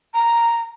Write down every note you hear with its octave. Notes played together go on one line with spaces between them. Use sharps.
A#5